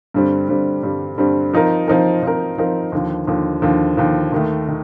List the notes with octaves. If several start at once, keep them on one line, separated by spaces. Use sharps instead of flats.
G2 D3 G3 C4
G2 D3 G3 C4
G2 D3 G3 C4
G2 D3 G3 C4
F3 C4 D#4 A#4
F3 C4 D#4 A#4
F3 C4 D#4 A#4
F3 C4 D#4 A#4
D#2 D3 F3
D#2 D3 F3
D#2 D3 F3
D#2 D3 F3
D#2 D#3 A3
D#3